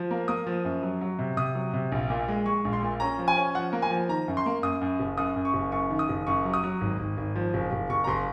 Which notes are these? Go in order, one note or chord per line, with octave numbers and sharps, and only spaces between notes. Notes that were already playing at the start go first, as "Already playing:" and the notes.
Already playing: F3
A#3
A#3 D#6
F3
F#2
F#3
F#3
C3
C3 D#6
F#3
C3
A#1
A#2
G#3
G#3 C#6
A#1
C6
A#2
C#4 A#5
F3
G#5
C#4
F3 F#5
A#3
G#5
F3
D#3 A#5
F#2
C6
A#3
F#2 D#6
F#2
F#1
F#2 D#6
F#2
C#6
F#1
F#2 C#6
D#3
D#6
F#1
F#2 C#6
F#3
D#6
F#3
G#1
G#1
G#1
F3
F#1
F#1
F#1 C#6
A#5
F#1 C6